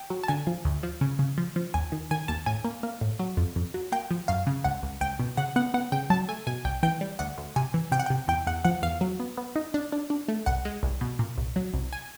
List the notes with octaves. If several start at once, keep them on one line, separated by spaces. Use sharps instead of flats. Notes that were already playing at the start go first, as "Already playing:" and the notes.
Already playing: G5
F#3
A5
D3 G#5
F3
D2
F3
C#3
C#3
F3
F3
D#2 G#5
D#3
D#3 G#5
D#2 A5
A2 G#5
A#3
A#3
A2
F#3
F2
F2
F#3
A#3 G5
F3
F#2 F5
C#3
C#2 F#5
C#2
C#2 G5
B2
C#3 F#5
B3 F#5
B3 F#5
C#3 G5
F#3 A5
A3 G#5
B2 G#5
C2 G5
E3 G5
G3
D2 F#5
D2
C3 G#5
E3
C3 G5
F#5
C3 G5
E2 G5
E2 F#5
F3 F#5
E2 F5
F#3
B3
B3
D#4
D4
D4
D4
A3
C2 F#5
G#3
C2
B2
A#2
C2
F#3
C2
G#5